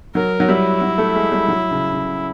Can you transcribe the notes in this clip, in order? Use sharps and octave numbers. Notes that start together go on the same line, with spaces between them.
F#3 A#4
F#3
G3 E4
F#3
A3
G#3
G3
F#3
C#3
C#3